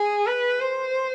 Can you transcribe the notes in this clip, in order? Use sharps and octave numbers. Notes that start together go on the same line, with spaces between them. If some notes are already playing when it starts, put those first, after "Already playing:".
Already playing: G#4
B4
C5